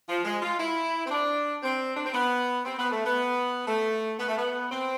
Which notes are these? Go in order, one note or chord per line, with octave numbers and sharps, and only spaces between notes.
F3
G#3
F4
E4
C4
D4
C4
D4
C4
B3
C4
B3
A3
B3
A3
B3
A3
B3
C4